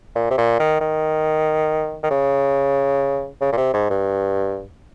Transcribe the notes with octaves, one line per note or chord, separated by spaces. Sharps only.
A#2
C3
A#2
D#3
D#3
D#3
C#3
C#3
A#2
C3
G#2
G2